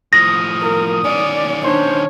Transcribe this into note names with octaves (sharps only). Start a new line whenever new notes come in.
A2 F3 D#6 A#6
A#4
D#3 C#4 D5
D4 C5 C#5